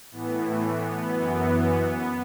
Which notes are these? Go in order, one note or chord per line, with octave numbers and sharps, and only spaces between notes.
A2 E3 B3
A3
B3
F#2 E3